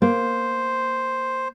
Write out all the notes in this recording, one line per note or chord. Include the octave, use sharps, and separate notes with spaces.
A#3 C5